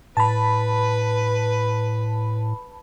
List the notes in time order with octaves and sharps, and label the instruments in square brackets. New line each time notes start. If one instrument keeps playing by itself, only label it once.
[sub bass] A2 [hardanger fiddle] B4 [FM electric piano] A5 B5